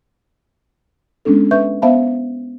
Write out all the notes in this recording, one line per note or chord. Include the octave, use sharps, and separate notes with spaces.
G#3 B3 C#4 D4 A4
B4 E5 C#6 G6
B3 C5 E5 F5 A5 B5